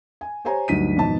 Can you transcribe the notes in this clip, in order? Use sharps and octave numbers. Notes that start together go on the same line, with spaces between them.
G#5
G4 C5 C#5 G#5 A#5
D2 G2 F#3 D#4 B6 D#7
G#1 F2 B2 D#4 A5